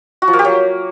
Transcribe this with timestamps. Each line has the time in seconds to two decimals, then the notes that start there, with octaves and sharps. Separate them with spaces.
0.22 F#4
0.28 F3
0.33 A#3
0.39 G4
0.45 F#3